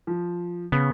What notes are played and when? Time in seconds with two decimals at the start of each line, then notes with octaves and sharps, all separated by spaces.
0.07 F3
0.72 C#3 B3